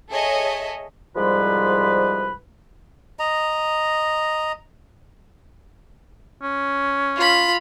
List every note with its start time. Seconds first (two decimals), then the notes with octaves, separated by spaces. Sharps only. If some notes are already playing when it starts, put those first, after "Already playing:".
0.10 G#4 A4 C#5 D#5 E5
1.16 C2 G#2 F3 G3 B4 B5
3.19 D#5 A#5
6.42 C#4
7.16 F4 B5